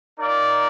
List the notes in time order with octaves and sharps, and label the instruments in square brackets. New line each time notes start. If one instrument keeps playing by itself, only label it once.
[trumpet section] D#4 A#4 D5 F5